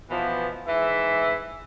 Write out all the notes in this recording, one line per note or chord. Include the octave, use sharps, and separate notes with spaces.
B2 E3 F3 B3
G#2 E3 E5